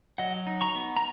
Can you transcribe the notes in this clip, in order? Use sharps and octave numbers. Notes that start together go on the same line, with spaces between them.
F#3 D#5 F#5
D#4
A#5 C#6
B3
A#5